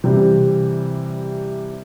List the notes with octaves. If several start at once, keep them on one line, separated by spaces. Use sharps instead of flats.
C3 E3 G3 C4